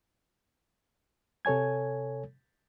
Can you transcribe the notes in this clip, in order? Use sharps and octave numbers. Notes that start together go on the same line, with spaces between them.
C3 A4 C#5 G#5 G#6